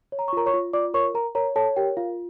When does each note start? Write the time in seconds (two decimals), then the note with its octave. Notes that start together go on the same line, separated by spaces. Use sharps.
0.12 C#5
0.19 A#5
0.28 C#6
0.33 F4 A#4 A#5
0.46 C#5 C#6
0.54 F4
0.73 F4 D5 D6
0.94 A#4 C#5 C#6
1.15 A#4 A#5
1.35 A#4 C#5 A#5
1.56 A4 C#5 A5
1.76 G4 A#4 G5
1.97 F4 F5